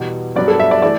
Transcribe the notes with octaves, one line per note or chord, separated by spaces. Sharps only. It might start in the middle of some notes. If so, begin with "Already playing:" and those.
Already playing: E2 B2 G3
G2 F#3 B3 D5
A4
E5
D5
E3 A3 D5